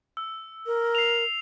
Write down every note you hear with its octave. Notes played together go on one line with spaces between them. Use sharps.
E6
A#4
C7 F7